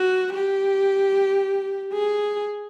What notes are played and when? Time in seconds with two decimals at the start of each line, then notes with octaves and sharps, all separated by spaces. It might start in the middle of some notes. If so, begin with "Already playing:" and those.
Already playing: F#4
0.33 G4
1.93 G#4